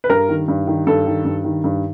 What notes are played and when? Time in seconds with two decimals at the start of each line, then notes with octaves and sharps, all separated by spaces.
0.04 B4
0.09 G2 A#4
0.29 D#3
0.48 G2
0.67 D#3
0.87 G2 A4
1.06 D#3
1.25 G2
1.44 D#3
1.64 G2